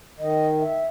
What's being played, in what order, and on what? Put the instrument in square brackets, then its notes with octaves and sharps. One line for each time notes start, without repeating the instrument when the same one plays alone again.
[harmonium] D#3 [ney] D#5
[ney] E5